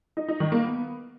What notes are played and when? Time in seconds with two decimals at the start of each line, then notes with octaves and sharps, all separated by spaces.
0.17 D#4
0.28 D#4
0.40 D#3
0.52 A#3
0.64 B3